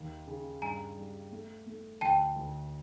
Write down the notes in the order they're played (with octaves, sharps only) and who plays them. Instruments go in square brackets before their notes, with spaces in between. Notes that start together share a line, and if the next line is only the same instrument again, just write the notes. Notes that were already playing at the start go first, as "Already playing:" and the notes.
Already playing: [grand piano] D#2
C#3
[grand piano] G2 [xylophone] G#5 A#5
[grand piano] G3
A3
A3
[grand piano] D2 [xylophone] G5 A5
[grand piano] D2